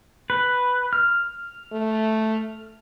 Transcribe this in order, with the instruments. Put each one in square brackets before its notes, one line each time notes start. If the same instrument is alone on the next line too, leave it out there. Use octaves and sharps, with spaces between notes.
[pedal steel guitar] B4
F6
[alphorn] A3